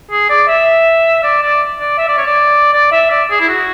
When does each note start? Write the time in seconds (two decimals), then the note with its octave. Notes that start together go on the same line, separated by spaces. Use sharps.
0.11 G#4
0.30 D5
0.48 E5
1.23 D5
1.42 D5
1.80 D5
1.98 E5
2.08 D5
2.18 C#5
2.26 D5
2.73 D5
2.92 E5
3.11 D5
3.31 G#4
3.40 E4
3.49 F#4